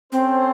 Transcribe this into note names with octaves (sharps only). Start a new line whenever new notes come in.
C4 C#4 A4 C5